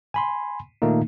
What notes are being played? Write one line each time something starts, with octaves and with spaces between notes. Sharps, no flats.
G#5 B5 C6
A#2 D#3 A3 A#3 D#4